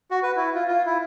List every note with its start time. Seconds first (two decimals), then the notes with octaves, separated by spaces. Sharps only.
0.11 F#4
0.23 B4
0.36 E4
0.54 F4
0.67 F4
0.86 E4